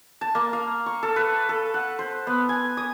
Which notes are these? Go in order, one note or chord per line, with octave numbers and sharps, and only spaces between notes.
A5
A#3
F5
C#6
A4
B4
A4
F#5
C5
B3
G#5
D#6